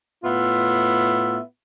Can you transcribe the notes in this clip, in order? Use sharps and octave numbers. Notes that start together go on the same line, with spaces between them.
A2 B3 F4 E5